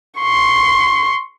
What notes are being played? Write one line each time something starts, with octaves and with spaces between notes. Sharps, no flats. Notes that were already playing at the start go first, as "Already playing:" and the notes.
C6 C#6